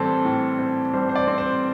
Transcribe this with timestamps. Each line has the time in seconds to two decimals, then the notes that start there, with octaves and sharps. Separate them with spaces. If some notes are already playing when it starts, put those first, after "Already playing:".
Already playing: A2 E3 G3 C4 A4
0.25 A2
0.59 C4
0.93 G3 C5
1.09 C5
1.16 D5
1.27 C4
1.38 C5